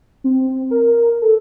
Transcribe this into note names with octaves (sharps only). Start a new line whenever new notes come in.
C4
A#4
A4